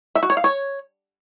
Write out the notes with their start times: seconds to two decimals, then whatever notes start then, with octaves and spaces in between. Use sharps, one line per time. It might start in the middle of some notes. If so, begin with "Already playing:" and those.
0.15 E5
0.23 F#4
0.30 C#5
0.37 F5
0.44 C#5